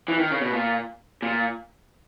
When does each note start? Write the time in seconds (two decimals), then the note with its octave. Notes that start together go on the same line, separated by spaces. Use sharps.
0.08 E3
0.19 D#3
0.31 C#3
0.41 B2
0.53 A#2
1.22 A#2